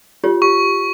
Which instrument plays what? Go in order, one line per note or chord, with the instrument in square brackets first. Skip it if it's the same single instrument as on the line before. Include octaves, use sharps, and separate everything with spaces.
[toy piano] F4 G4 C#5
[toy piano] G4 [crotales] C#6